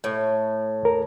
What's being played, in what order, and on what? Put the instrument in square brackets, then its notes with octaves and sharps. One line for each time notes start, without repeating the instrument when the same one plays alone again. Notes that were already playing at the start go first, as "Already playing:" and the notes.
[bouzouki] A2
[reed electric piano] D#2 A#4